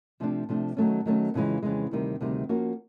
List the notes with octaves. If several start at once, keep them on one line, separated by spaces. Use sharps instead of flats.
C3 F3 A3 D4
C3 F3 A3 D4
D#3 F#3 A3 C#4
D#3 F#3 A3 C#4
F2 C#3 E3 G#3
F2 C#3 E3 G#3
D2 C3 D#3 G3
D2 C3 D#3 G3
F3 A#3 C#4 F#4